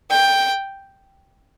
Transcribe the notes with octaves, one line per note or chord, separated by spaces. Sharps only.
G5